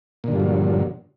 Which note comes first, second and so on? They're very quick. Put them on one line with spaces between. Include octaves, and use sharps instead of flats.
A#2 D3 G2 F3 F#3